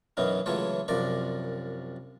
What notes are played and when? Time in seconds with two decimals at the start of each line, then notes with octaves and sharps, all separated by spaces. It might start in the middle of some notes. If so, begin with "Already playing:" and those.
0.17 F#2 B2 E3 F#3 C#4 D#4
0.46 C#2 E3 F#3 A3 F4 C#5
0.88 C2 F#2 F3 D5 A#5